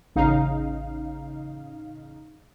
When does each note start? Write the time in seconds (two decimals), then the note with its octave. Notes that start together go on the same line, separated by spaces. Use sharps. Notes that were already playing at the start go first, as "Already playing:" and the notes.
0.16 A1 C#3 D#4 F5